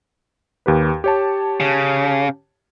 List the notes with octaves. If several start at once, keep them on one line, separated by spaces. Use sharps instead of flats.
D#2 G4 B4
G4 C#5 A5
C#3